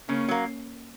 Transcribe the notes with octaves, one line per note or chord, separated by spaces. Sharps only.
C#3 A#3 C#4
F#3 A#3